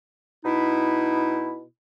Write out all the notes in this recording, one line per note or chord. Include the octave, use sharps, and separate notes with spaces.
B2 D#4 E4